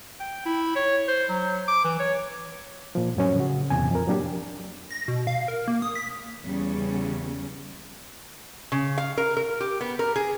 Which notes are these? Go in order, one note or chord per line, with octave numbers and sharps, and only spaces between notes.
G5
E4
C#5
C5
F#3
D6
E3
C#5
A#2 F3
F2 A2 F#3 C#4
C#3 F#4
E2 A2 C3 G#5
F2 A#4
F#3 A#3 D4 G4
A#6
B2
F5
A#4
A#3
D#6
B6
E2 C#3 G3 C#4
C#3
F5
A#4
A#4
G4
B3
A#4
G#4